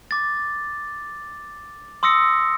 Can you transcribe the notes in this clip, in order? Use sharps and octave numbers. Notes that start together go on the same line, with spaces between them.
D6 A6
C6 D#6 E6 A#6 C#7